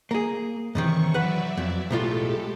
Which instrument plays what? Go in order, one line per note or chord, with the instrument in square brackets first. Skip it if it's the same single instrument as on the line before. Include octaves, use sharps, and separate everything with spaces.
[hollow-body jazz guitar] A#3 G#4
[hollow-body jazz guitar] F#2 C3 D#3 [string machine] E3 C#6
[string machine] F#3 D5 E5 [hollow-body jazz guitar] B4 F#5
[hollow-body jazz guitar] F2
[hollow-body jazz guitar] B1 A2 F4 [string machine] G#3 G4 A4